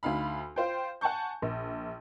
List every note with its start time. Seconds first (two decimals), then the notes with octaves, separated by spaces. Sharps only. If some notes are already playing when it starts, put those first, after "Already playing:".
0.03 D2 D#4 F5 B5
0.56 F4 C5 G5
1.01 F#5 G#5 A5 C#6 G6
1.42 A#1